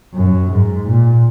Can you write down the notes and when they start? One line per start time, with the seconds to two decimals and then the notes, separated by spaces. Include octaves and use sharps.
0.14 F#2
0.50 G#2
0.87 A#2